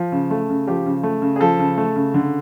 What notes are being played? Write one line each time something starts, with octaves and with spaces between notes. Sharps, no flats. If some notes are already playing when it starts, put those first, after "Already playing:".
Already playing: F3
C#3
A3
C#3
F3 G4
C#3
A3
C#3
G#4
F3 A4
C#3
A3
C#3
D3